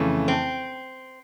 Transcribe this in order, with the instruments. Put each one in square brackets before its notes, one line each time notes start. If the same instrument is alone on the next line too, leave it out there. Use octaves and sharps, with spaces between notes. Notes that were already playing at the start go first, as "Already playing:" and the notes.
Already playing: [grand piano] F2 C#3 E3 A3
[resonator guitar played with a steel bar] C4